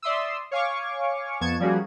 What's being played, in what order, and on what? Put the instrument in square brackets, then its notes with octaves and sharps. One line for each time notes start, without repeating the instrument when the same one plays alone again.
[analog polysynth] D5 E5 C6 D#6 E6
C#5 F5 G#5 C#6 D6
F2 B3 A5 C#6 G#6
F3 G3 A#3 C#4 F#4 G#4